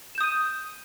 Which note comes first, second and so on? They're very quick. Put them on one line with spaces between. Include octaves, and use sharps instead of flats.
E7 G6 D#6 D#7